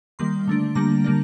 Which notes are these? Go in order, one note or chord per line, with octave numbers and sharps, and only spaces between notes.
D#3 G3 A#3 C6
D3 A3 D4
D3 G3 A#3 D4 A#5
D3 G3 A#3 D4